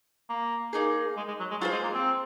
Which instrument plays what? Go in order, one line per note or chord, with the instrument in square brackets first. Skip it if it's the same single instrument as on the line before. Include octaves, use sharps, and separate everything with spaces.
[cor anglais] A#3
[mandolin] A#3 D#4 G#4
[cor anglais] G#3
G#3
F#3
G#3
[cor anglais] F#3 [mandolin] F4 G#4 C5
[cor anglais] G#3
A#3
C4